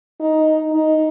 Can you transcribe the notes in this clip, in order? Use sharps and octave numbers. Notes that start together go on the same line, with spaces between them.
D#4
D#4